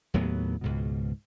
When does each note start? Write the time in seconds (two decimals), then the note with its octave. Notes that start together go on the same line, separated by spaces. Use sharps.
0.14 D#2 A2 F#3 B3
0.61 C#2 G#2 B2